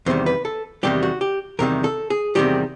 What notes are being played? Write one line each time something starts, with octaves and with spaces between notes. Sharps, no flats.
E2 C3 D#3 G3 C5
B4
A4
E2 C3 D#3 G3 G4
F#4
G4
E2 C3 D#3 G3 A#4
A4
G#4
E2 C3 D#3 G3 G4